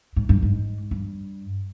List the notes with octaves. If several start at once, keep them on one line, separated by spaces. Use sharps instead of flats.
G#2
G2
G#2
G2